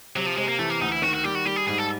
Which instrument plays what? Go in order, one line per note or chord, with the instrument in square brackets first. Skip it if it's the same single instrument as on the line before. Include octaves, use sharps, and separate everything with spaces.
[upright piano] C3 [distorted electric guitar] F#3
[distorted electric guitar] F3
[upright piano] C3 [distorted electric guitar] G#3
[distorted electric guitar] A#3
[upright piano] E3 [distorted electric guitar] A3
[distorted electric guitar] A#3
[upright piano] D2 [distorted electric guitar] D#4
[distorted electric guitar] E4
[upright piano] D#3 [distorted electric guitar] F#4
[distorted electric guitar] F#4
[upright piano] G3 [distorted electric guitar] G4
[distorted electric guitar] F#4
[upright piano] G3 [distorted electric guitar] G4
[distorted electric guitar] G#4
[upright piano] G#2 [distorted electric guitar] G#4
[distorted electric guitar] A4